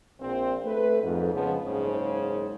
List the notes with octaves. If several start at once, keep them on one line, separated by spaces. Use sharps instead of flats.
A#1 C4
A3 B4
F2 G#2
C#2 C#3 F3 B3
F#1 G#2 C#3 C5